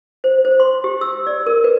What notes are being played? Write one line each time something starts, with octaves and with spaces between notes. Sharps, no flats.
C5
C5
C6
G4
E6
D5
A#4
B4